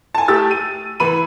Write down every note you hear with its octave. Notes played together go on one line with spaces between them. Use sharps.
G#5 A5
A3 G4 E6 A6
D#7
E3 E4 B5 D#7